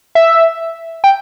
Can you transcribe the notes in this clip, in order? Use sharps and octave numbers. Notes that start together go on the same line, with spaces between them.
E5
G5